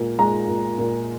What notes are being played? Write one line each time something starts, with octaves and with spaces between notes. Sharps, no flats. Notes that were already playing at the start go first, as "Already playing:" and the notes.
Already playing: A#2 G#3
G#3 A#5
A#2
A#2